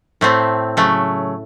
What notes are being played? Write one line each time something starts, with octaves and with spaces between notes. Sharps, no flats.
A2 A3 C4
C#3 F#3 A3